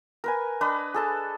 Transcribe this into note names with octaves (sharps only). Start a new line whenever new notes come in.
A#4 B4 G#5
D4 B4 D#5 A#5
G#4 A4 A5